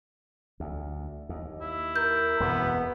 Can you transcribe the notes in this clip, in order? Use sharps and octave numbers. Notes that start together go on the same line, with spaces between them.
D2
D#2
E4
A#4 G6
E1 F#2 C3 B3